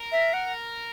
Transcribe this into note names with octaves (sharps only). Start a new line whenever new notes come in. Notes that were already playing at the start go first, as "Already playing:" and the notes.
Already playing: A#4
E5
F#5